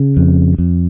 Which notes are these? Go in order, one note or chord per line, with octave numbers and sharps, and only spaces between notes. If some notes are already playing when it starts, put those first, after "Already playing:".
Already playing: C#3
F2
F2